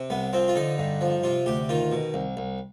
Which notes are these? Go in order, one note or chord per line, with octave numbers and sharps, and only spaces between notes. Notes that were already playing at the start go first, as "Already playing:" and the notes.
Already playing: C3
C2 B3
F3 C4
F4
D3 D#4
G2
F3
C3 F4
D2 G4
D#3 F4
B2
C2
C2